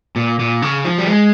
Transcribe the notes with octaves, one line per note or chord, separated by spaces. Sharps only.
A#2
A#2
C#3
F3
G3
G#3